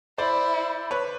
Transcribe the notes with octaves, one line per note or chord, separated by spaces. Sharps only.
E4 C5 D5
B4 C#5